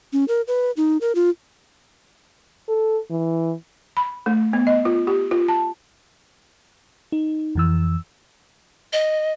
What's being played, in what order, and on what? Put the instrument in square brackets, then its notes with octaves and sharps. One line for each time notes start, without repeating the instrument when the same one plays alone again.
[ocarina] C#4
A#4
B4
D#4
A#4
F4
[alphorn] A4
E3
[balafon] B5
A3
B3
D#5
F4
G4
F4
A5
[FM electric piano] D#4
F2 E3 E6
[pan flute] D#5